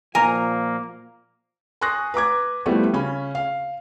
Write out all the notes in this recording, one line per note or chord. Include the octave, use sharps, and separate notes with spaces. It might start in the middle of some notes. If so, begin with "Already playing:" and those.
A#2 F3 A#3 A#4 G#5 A#5
G#5 C6 C#6 D#6 F#6 A#6
B4 A#5 D6 G#6
F3 G3 A3 B3 E4 F#4
C#3 C#4 B5
F5